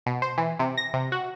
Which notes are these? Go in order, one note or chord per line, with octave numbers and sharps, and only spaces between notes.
B2
C5
E3
C3
A#6
C3
F#4